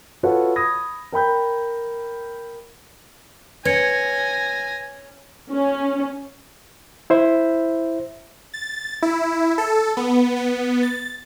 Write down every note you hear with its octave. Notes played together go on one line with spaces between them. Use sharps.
F4 F#4 A4 B4 C#5 F#5
B5 D#6 G#6 A#6
A#4 G5 B5 G6
C#4 B4 G#5 G#6 A#6 C#7
C#4
E4 C5 E5
A6
E4
A4
B3
B3
A6